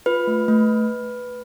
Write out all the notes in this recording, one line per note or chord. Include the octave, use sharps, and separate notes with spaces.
F4 B4
A3
A3